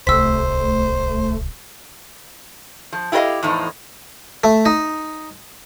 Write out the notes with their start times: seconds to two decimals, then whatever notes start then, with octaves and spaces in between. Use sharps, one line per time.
0.07 D1 C2 A3 C5 E6 B6
2.93 F3
3.12 E4 F4 G4 A#4 D#5 F5
3.43 E2 A2 F3 D#4
4.44 A3
4.66 D#4